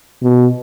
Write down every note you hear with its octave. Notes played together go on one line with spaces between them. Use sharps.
B2